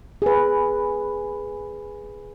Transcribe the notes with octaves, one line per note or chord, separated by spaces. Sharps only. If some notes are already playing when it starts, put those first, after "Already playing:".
G#4 B4